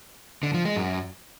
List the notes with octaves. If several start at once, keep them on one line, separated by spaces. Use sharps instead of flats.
D3
F3
G#3
F#2